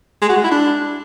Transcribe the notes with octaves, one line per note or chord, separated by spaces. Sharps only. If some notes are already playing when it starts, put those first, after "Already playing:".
G#3
F#4
G#3
E4
D4